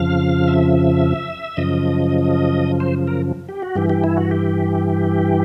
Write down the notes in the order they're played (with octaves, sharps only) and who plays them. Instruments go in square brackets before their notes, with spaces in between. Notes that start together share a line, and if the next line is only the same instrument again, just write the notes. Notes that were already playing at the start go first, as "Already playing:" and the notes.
Already playing: [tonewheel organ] F2 C#3 F3 F5
E5
F#2 C#3 F3 D#5
C5
A#4
G4
F#4
G2 E3 G4
G4
E4
F#4
G4